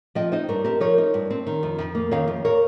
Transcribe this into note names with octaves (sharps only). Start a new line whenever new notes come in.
F3 D#5 G5
D#4 C5 D#5
G2 A#4 C#5
C4 G4 A#4
F3 A#4 C#5
D#4
G2
C4
D#3
F2
F2
A#3
D#3 C#5 F5
F2
A#4 C#5